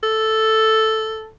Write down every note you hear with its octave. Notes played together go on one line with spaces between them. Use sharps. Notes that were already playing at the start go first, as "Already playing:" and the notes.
A4